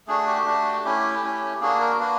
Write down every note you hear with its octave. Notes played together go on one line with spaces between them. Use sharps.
A3 D4 F#4 G#4
G4
A3 D4 F#4
A3 C#4 E4 G4
A3 C#4 E4
A#3 D4 F#4 G#4
A#4
A#3 D4 F#4 B4